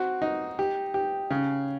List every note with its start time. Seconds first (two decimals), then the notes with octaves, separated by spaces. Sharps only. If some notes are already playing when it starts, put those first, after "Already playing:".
Already playing: C4 F#4
0.22 D#4
0.59 G4
0.94 G4
1.31 C#3